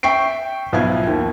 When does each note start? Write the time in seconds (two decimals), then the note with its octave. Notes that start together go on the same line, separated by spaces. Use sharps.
0.03 E5 G5 C#6 C7 D7
0.73 B1 F3 B3 E4 F5 G#6
1.07 D#2